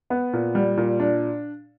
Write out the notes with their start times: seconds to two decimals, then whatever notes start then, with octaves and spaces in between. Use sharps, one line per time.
0.10 B3
0.33 A#2
0.55 G3
0.77 A#2
1.00 D4